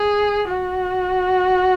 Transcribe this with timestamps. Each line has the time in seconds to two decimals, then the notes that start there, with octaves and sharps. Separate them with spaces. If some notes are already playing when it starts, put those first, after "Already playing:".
Already playing: G#4
0.48 F#4